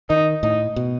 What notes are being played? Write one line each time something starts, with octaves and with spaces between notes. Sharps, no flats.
D#3 D#4
A2 D#4
B2